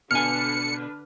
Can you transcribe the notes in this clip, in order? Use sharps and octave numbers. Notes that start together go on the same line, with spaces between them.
B2 D3 D4 B4 G#5 F6 C#7